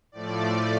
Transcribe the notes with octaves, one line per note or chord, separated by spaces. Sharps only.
A2 F3 A3 D5